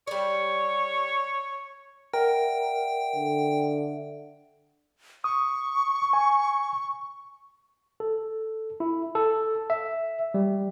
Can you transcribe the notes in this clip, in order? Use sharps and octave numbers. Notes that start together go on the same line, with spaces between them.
G3 C#5 D5
A#4 D5 E5 F#5 G5
D3
C#6 D#6
G#5
A4
E4
A4
E5
G3